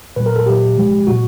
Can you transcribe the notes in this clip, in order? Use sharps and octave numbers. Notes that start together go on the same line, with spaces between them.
A#2 F#3 B4
A#4
A4
A#2 F#3 G4
C3 F3 G#3
A#2 F#3 F#4